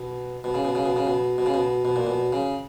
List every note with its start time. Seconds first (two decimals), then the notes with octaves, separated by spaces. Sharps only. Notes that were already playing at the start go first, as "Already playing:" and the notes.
Already playing: B2
0.44 B2
0.54 C#3
0.65 B2
0.75 C#3
0.86 B2
0.96 C#3
1.07 B2
1.38 B2
1.46 C#3
1.54 B2
1.85 B2
1.96 A#2
2.07 B2
2.33 C#3